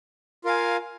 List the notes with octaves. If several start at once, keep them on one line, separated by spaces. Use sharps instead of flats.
F4 A#4 F5 G#5